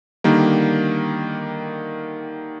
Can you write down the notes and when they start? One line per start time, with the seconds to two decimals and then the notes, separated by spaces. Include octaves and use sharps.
0.24 D3 D#3 G3 A#3